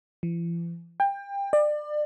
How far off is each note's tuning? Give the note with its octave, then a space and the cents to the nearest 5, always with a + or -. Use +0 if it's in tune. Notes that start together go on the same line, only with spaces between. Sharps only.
E3 +45
G5 +25
D5 +30